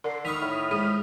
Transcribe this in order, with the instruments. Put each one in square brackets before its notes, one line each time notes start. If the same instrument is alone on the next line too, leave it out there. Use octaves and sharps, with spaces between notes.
[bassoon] D3 [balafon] A#4 [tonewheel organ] C6
[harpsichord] D#3 E5 C#6 [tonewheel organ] B5 D#6 F6
[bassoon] A2
[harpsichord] G#2 [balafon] G#4